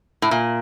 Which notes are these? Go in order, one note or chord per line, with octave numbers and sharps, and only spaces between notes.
A2
A#2